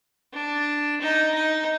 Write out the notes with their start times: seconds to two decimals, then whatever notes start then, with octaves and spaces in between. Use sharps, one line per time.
0.33 D4
1.01 D#4
1.35 D#4